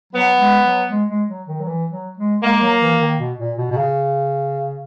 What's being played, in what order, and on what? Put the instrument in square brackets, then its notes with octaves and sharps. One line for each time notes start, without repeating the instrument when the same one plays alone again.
[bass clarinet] F#3 [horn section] B3
[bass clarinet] G#3
F#3
G#3
G#3
F#3
D#3
F#3
E3
F#3
G#3
[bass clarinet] G#3 [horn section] A#3
[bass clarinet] G#3
F#3
E3
D#3
B2
A#2
B2
B2
C#3